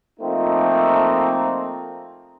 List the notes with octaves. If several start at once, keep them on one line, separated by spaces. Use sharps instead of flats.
F3 A3 A#3 C4 D#4